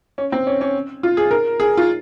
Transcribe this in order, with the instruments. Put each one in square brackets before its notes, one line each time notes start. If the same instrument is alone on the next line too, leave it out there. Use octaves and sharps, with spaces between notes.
[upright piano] C#4
C4
C#4
C#4
F4
G#4
A#4
G#4
F4